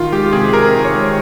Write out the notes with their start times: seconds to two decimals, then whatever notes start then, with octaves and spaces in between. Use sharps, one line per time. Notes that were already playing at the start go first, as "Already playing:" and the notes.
Already playing: D#3 F4
0.12 G#3 G4
0.33 C3 G#4
0.53 C3 A#4
0.75 D#3
0.85 C#5
0.95 G#3